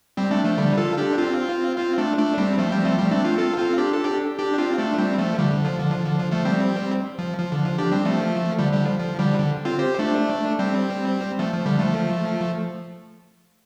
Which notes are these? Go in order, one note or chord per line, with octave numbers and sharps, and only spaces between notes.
G3 C4
A3 D4
F3 A3
D3 G3
F4 A4
D4 G4
C4 F4
C4 F4
A3 D4
A3 D4
G3 C4
F3 A3
G3 C4
F3 A3
G3 C4
A3 D4
C4 F4
F4 A4
C4 F4
D4 G4
A4
D4 G4
D4 G4
C4 F4
A3 D4
G3 C4
F3 A3
D3 G3
D3
F3
D3
F3
D3
F3
F3 A3
G3 C4
F3
F3
D3
F3
D4 G4
G3 C4
F3 A3
D3 G3
D3 G3
F3
F3
D3 G3
D3
C4 F4
G4 C5
A3 D4
G3 C4
F3 A3
F3
D3 G3
F3 A3